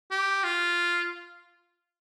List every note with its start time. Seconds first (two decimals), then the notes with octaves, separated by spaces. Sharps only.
0.11 G4
0.44 F4